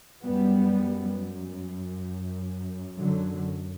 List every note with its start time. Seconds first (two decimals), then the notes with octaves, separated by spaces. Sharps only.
0.23 F#2 G3 B3
2.97 D3 F#3